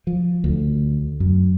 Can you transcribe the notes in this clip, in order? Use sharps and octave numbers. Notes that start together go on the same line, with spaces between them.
F3
D2
F#2